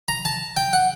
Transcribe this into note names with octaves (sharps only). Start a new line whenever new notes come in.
A#5
A5
G5
F#5